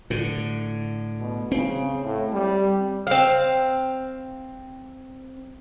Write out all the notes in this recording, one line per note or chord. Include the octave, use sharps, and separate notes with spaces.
A2 D3
B2
C#3 C4
A2
G3
C4 F5